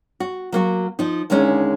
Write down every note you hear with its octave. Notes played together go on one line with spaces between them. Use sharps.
F#4
F#3 A#3 F#4
F3 D#4
D#2 D3 G#3 C#4 D#4